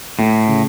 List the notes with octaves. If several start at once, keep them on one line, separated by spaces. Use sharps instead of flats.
A2 A3
C#3